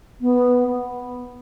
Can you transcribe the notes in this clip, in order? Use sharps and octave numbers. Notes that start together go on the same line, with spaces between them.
B3